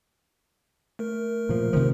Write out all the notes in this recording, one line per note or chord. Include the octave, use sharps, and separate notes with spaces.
A3 A#4
A#2 F3
C3 D#3 F3